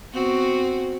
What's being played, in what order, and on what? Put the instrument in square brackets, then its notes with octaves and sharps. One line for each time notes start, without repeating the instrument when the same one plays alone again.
[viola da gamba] B3 C4 F#4